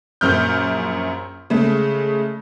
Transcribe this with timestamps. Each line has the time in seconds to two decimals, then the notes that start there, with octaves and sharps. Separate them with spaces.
0.21 A#1 F#2 F6 G6
1.50 C#3 G#3 A3